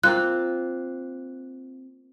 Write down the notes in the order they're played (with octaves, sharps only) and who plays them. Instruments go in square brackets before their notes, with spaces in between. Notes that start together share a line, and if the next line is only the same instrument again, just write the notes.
[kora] A#3 C4 F4 [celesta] F#6